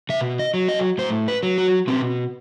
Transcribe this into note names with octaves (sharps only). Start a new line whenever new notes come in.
B2 E5
D#5
F#3
D#5
A2 C5
B4
F#3
F#4
B2 C4